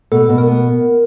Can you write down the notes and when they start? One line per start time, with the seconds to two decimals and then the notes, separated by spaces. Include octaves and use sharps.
0.12 B2 A4
0.29 B2
0.38 A#4
0.47 B3